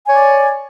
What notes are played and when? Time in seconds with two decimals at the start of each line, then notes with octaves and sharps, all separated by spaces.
0.07 G#5
0.10 C#5
0.12 D5